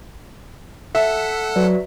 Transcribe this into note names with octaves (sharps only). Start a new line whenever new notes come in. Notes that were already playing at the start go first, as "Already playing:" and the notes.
A4 E5 F#5
F#3 F#4 B4 D5